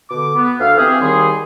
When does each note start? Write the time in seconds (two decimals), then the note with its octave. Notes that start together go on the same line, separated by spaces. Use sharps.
0.10 B2 D3 D6
0.35 B3
0.59 D2 A4 F5
0.77 E3 C4 G4 G#4
1.01 D#2 D#3 G3 G#4 C6